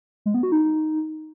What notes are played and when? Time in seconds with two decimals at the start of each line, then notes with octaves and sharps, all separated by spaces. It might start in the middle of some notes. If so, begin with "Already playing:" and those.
0.26 G#3
0.34 B3
0.43 F#4
0.52 D#4